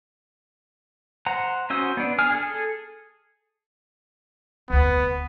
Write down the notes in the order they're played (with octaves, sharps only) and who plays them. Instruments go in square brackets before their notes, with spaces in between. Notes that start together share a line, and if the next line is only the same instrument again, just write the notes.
[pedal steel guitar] C5 F#5 A#5
C#4 F#4 C5 D#6 E6
B3 D4
G#4 G#5 D#6 F6
G#4 A4
[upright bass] F1 D2 [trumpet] B3